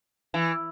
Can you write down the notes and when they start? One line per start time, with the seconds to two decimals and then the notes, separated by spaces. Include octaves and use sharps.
0.34 E3